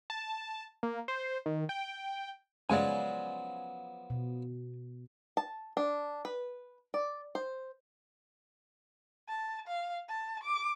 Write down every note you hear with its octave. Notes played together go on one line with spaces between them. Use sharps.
A5
A#3
C5
D#3
G5
C#3 F3 F#3 G#3 B3 D5 G#5
B2
A5
D4
B4
D5
C5
A5
F5
A5
D6